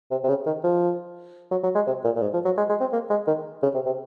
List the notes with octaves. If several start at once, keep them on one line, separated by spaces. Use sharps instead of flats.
C3
C3
C#3
D#3
F3
F#3
F#3
G#3
C3
A#2
A#2
G#2
F3
F#3
G#3
G#3
C4
A#3
G#3
D#3
C#3
C3
C3